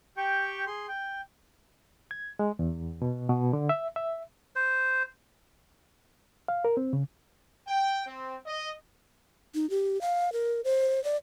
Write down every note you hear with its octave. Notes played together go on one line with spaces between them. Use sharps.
G4 G5 C#6
G#4 C6
G5
G#6
G#3
E2
B2
B2
D3
E5
E5
C5
F5
A#4
C4
C#3
G5
C4
D#5
D#4
G4
F5
A#4
C5
D5